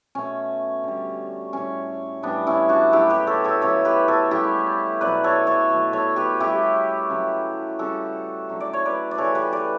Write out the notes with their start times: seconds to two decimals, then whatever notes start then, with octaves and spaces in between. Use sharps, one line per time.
0.15 B2 A3 C#4
0.83 D3 G3
1.53 A2 G3 C#4
2.22 A2 E3 G3 B3 D4
2.47 C#4 E4
2.69 D4 F#4
2.92 C#3 F#3 A3 E4 G4
3.09 G4 B4
3.27 A4 C#5
3.44 A4 C#5
3.61 C#3 F#3 A3 A4 C#5
3.85 G4 B4
4.08 A4 C#5
4.31 C#3 G3 E4 G4
5.01 B2 F#3 A3 B4 D5
5.24 A4 C#5
5.47 A4 C#5
5.70 B2 F#3 A3
5.93 A4 C#5
6.16 G4 B4
6.39 C#3 G3 E4 G4
7.10 C#3 F#3 A3
7.79 C#3 G3 F#4 A4
8.49 D3 F#3 A3
8.60 D5
8.73 C#5
8.85 B4 D5
9.11 D5
9.18 C#3 E3 A3 A4 C#5
9.35 G4 B4
9.52 B4 D5